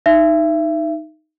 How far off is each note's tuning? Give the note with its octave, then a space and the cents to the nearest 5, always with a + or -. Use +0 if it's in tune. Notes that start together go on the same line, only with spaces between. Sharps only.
D#4 +0 E5 +30